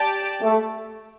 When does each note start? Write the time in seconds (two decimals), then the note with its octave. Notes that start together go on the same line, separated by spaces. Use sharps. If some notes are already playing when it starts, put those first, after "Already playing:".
Already playing: G4 D5 A5
0.42 A3